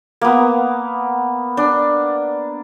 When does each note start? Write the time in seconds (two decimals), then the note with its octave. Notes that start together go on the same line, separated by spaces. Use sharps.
0.21 A#3 B3
1.57 D4